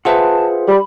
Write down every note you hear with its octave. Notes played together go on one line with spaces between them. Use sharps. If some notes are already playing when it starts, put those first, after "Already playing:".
F4 G#4 B4 C5 E5 F#5 A5
G3 B5